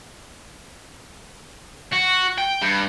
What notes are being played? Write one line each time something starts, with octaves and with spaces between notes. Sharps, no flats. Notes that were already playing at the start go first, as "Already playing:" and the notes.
F#4
G5
G2